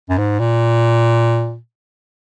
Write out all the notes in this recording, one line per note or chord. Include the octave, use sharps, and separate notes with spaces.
F#2
G#2
A#2